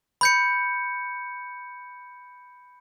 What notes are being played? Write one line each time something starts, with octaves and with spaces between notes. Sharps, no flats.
B5 G6 C#7